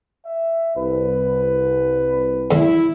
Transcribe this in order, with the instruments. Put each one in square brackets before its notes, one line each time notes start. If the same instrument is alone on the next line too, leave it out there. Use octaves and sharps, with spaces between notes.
[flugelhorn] E5
[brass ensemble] C2 [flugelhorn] B4
[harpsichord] E2 [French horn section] E4